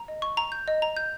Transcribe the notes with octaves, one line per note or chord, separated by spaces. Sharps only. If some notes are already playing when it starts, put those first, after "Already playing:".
Already playing: A#5
D#5
C#6
A#5
G6
D#5
A#5
G6